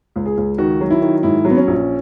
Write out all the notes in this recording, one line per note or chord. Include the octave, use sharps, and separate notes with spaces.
C#2
G#4
C#2
D#3 F#4
F#3
E4
D#3
G#2 E4
F#3
B3
C#4
A#1